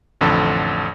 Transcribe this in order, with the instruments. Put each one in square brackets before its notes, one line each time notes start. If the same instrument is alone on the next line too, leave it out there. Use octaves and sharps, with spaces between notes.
[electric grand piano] A1 F2 D3 A4